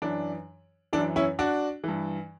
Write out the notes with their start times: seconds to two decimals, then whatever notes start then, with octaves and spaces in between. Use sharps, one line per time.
0.02 F#2 E3 D4
0.93 E3 D4
0.97 F#2
1.16 C#4 E4
1.39 D4 F#4
1.84 G2 E3